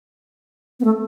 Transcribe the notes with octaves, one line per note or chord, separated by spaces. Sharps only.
B3
A3